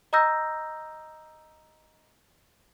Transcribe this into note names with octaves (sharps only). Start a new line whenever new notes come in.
D#5 A#5 D#6 E6 G6 A#6